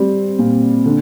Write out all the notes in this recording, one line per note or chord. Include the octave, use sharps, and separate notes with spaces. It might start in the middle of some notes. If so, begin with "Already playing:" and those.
Already playing: G3 C4
A#2
D3